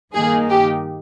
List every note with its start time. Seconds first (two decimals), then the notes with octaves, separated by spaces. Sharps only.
0.13 G2 D#3 A#3 D#4 G#4
0.50 G4